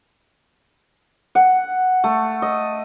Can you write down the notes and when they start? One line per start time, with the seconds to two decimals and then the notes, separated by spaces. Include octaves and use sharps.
1.35 F#5
2.04 A3
2.42 D#5